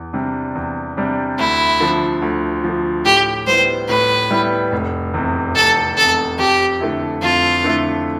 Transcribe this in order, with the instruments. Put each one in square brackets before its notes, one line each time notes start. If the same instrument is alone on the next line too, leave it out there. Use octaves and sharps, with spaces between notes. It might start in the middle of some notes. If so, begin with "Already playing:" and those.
Already playing: [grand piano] E2
C3 G3 D4
E2
C3 G3 D4
[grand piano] D2 [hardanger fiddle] E4
[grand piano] D3 F3
D2
D3 F3
[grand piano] A2 [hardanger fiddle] G4
[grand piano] G3 B3 E4 [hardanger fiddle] C5
[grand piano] A2 [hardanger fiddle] B4
[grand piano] G3 B3 E4
F1
E2 C3
[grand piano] F1 [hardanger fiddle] A4
[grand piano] E2 C3 [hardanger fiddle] A4
[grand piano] F2 [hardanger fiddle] G4
[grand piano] D3 A3 E4
[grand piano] F2 [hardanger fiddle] F4
[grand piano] D3 A3 E4